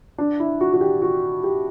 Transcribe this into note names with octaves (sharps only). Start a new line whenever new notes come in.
D4
E4
F#4
F#4
G4
F#4
G4